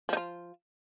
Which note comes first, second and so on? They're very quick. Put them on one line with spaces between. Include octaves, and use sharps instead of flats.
F3 D#4 F4